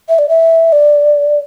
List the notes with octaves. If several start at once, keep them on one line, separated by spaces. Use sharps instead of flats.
E5
D5
E5
D5